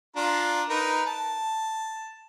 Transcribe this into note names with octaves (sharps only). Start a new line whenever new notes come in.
D4 F4 A#5
D#4 A#4 B4
A5